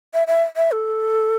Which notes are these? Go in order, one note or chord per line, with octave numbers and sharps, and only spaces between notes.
E5
E5
E5
A4